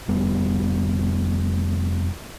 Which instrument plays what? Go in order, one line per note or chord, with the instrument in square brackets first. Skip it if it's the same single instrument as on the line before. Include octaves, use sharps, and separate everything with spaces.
[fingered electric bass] F1 G3 B3